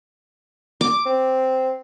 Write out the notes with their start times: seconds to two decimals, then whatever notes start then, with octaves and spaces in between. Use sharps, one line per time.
0.81 D6
1.06 C4